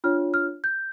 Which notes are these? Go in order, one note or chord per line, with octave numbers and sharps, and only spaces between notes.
D4 F4 C#5 F6
F6
G6